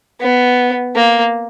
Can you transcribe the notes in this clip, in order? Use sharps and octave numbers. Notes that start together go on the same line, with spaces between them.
B3
A#3